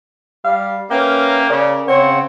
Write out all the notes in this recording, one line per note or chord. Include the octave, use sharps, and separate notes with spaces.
G3 F5
A#3 C#4 B4 E5 G5
C#3 A#4 D5
C#3 C4 C#5 F#5